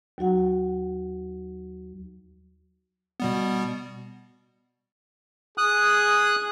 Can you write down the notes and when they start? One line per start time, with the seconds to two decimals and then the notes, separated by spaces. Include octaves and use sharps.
0.18 D#2 F#3 F#4 F#5
3.20 B2 G3 B3
5.58 G#4 D#6 F#6